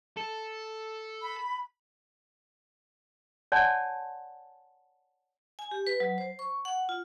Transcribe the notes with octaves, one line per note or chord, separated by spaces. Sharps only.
A4
B5
C#5 D5 F#5 G#5 A5 C6
G#5
G4
B4
F#3
C5
C#6
F#5
F4